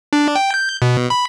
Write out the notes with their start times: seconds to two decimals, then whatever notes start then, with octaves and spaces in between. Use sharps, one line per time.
0.13 D4
0.35 G5
0.54 G6
0.82 B2
1.10 B5